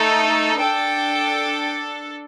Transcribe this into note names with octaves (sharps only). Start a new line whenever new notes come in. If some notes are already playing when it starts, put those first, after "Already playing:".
Already playing: A3 D#4 A4
D4 A4 G5